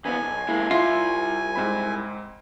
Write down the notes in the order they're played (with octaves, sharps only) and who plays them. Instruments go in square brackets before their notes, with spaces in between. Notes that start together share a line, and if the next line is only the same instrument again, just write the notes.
[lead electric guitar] D#2 B3 [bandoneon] G#5
[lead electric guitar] B1
[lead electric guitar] G#3 A#3 [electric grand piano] E4
[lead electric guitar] C2 E5 [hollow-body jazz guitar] F4
[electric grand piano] G#2 C4 B5